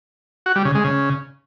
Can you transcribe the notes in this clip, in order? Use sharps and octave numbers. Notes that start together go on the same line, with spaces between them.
F#4
G3
C#3
G#3
C#3